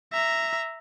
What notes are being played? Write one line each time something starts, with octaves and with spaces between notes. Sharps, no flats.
E5 A#5